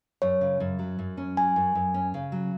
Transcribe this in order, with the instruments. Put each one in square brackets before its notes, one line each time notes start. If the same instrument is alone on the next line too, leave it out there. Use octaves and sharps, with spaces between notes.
[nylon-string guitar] F#2 [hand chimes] C#5
[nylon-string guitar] C#3
F#2
F#3
F#2
C#4
[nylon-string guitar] F#3 [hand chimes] G#5
[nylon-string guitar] F#2
F#2
C#4
C#3
F#3